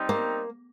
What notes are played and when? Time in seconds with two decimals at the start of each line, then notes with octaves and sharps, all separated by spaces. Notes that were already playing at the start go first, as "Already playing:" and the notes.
Already playing: G3 C4 D#4
0.09 A#3